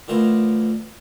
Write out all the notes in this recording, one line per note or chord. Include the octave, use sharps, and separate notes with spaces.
D3 E3 F3 A3 A#4 C5